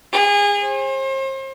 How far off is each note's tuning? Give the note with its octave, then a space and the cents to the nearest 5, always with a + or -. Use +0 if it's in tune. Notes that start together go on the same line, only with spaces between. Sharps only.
G#4 -30
C5 +40